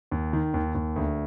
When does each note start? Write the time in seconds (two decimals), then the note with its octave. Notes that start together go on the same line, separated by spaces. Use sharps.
0.11 D#2
0.33 D#3
0.54 D#2
0.75 D#2
0.96 D2